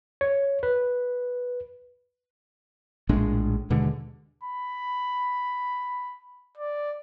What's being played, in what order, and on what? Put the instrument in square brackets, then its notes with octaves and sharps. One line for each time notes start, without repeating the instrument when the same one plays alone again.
[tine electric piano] C#5
B4
[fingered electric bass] A#1 A2 G#3 D4
D#2 B2 D3 G#3
[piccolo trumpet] B5
D5